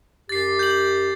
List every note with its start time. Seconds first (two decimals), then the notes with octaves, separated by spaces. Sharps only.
0.29 F#2 G4 A6 C7
0.59 G6 F#7